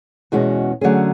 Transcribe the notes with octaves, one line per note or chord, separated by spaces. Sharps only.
E2 B2 G#3 C#4 F#4
D3 F#3 A3 C#4 G#4